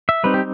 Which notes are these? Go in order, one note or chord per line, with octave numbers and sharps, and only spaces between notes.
E5
G3 C4 D#4 B4
G4